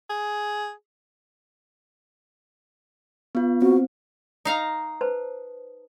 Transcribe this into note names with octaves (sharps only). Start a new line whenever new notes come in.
G#4
B3 F4
C4 F#4
D#4 F5 A#5
B4 C5 A5